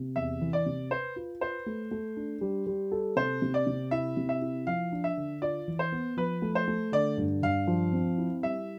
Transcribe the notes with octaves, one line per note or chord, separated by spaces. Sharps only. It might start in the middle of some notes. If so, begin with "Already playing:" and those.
Already playing: C3
E2 E5
E3
D5
C3
B4 C5
F4
B4 C5
A3
A3
D4
G3
G3
A4
C3 C5
C3
D5
C3
E4 E5
C3
E5
E4
F3 F5
D4
E5
D3
F4 D5
E3
C5
B3
F3 B4
A3
C5
A3
D3 D5
G2
G2 F5
F3
C4
E4
G3 E5